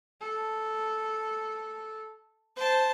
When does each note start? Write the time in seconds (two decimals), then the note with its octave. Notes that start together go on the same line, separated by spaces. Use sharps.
0.21 A4
2.56 C5 A5